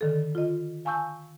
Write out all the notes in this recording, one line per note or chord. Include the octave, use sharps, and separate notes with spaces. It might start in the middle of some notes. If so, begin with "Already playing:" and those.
D3 D#3 A4
F4 D#5
F5 G#5 A5 C#6 E6 G6